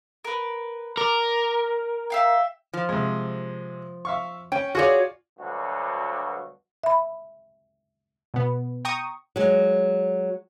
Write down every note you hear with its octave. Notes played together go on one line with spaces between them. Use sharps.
A#4 B4
A#4 D5
E5 F5 G5
F3
C3 G#3
E5 F5 C#6
C#4 G5
F4 F#4 G#4 C#5 D5
D2 G2 B2 F#3 F#4
E5 B5
B2 B3
G5 A#5 C#6 D#6
F#3 G#3